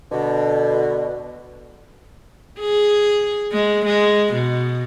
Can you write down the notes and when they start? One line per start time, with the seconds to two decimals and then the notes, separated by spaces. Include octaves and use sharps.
0.12 B2 D3
2.60 G#4
3.52 G#3
3.85 G#3
4.33 B2